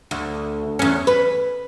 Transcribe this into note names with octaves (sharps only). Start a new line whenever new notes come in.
D2
E2 C#4
B4